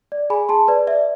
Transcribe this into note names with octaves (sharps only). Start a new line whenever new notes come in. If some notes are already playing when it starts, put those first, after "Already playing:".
D5
G#4 G#5 B5
G#4 A5 C6
B4 D5
D5 E5